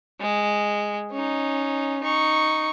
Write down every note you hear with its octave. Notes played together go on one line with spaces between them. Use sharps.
G#3
C#4 D#4
D#4 C#6